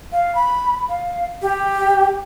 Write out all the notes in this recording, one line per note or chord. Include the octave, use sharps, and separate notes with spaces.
F5
B5
F5
G4